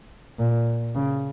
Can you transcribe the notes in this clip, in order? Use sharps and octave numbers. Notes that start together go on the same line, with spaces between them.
A#2
C#3